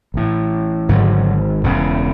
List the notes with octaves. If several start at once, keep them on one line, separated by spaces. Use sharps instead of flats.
A1 A2
G#1 G#2 D3 F#3
E1 E2 C#3